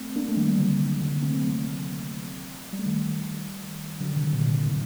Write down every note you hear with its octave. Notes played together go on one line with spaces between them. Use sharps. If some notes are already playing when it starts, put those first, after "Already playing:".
Already playing: A3 C4
A#3 D4
A3
D#3 G3
D3 F#3
C3 D#3
D3 F#3
A#3
A3 C4
F#3 A3
G3
A3
D#3 G3
D3 F#3
C3 D#3
A#2 D3
C3 D#3
A2 C3